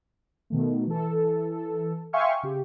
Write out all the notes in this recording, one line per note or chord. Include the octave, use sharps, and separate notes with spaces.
B2 D#3 A3
E3 A4
E5 F5 G5 G#5 C6 C#6
C#3 G4